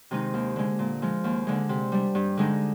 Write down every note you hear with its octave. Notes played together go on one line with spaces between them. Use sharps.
C3 D#3 G#3 D#4
D#2
D3 G#3
A#2
F3 G#3
D#2
D3 G#3
C3
G3 D4
G2
D3 G#3 D#4